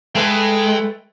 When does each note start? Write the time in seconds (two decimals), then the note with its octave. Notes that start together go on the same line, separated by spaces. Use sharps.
0.15 G#3 A3 B4 G5 A5